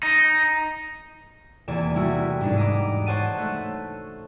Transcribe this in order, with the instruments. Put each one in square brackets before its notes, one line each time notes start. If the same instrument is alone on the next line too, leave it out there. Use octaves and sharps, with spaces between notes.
[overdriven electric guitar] D#4
[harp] E2 C3 A#3 D5 G#5 E7
C3 G3 A3 E4 F#4
G#2 G3 B3 D4 G#4
D#5 A#5 D6
C5 C#5 F#5 A5 D#7
A3 F#6